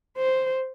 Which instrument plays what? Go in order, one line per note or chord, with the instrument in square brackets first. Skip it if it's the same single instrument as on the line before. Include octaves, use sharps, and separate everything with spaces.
[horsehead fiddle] C5